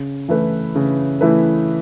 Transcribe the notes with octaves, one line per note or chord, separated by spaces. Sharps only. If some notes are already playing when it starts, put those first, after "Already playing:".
Already playing: C#3
E3 A3 E4 B4
C#3
E3 A3 E4 B4